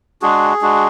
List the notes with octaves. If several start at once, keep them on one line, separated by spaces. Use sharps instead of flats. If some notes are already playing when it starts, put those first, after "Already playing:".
G#3 D4 F#4 G#4
G#3 D4 F#4